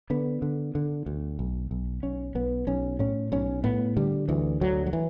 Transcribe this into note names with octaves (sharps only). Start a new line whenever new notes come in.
D3 B3
D3
D3
D2
B1
B1
B1 C#4
B1 B3
B1 C#4
A2 C#4
B1 C#4
A2 B3
D3 G3
D2 E3
D2 F#3
F#3
E3